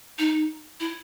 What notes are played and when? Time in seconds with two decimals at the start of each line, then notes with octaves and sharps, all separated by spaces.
0.18 D#4
0.80 E4